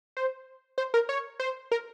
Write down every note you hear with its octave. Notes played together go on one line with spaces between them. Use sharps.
C5
C5
A#4
C#5
C5
A#4